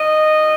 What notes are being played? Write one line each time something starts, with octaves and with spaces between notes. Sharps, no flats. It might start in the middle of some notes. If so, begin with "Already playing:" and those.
Already playing: D#3 D#5
G3